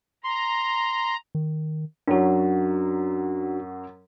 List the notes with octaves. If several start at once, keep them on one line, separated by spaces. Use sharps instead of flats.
A#5 C6
D#3
F#2 F#3 D4 F#4